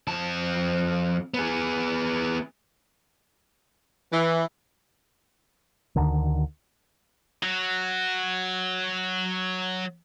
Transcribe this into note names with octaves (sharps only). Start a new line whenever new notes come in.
F2 A5
B3 G#4
E3
D2 D3 D#3
F#3 F#4